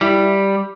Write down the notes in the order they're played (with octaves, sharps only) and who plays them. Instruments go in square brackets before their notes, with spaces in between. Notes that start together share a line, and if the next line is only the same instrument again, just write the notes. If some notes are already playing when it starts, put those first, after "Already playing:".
[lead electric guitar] G3 [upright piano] E4